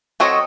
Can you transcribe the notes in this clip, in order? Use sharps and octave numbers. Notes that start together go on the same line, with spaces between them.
F#3 C4 F#4 A4 C#5 D#5